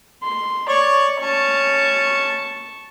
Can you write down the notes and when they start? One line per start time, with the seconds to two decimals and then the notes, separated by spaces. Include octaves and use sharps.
0.23 C6
0.69 C#5 D5 C#6
1.20 C#4 A5 C#6